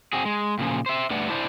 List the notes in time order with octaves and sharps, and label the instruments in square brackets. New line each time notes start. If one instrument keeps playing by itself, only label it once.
[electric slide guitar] C4 F#4 G#4
G#3
A#2 C#3 F3
C5 E5
G2 A3 B4 D5 F#5
D4 E4 C5 D5